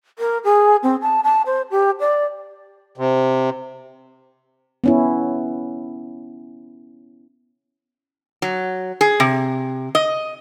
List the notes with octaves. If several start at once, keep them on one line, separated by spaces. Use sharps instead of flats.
A#4
G#4
C4
A5
A5
C5
G4
D5
C3
B3 C#4 E4
F#3
G#4
C3
D#5